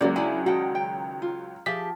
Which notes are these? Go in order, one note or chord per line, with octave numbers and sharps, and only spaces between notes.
C#2 F#3 A#3 D5
D4 E4 G#4 G#5
D#3 F#4 F#5 G5 A5
G5
F4
F3 G4 G#4 E5 B6